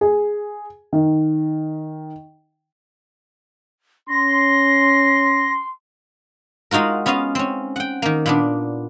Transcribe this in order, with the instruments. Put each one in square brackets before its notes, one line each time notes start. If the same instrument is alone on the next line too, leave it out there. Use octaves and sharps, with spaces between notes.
[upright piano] G#4
D#3
[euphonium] C#4 [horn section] C6 [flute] A#6
[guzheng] G#3 D#4 F4 F#4 A#4
B3 C#4 F4 D#5 F5
C4 C#4
F#5 G5
D#3 A#3
A#2 B3 D4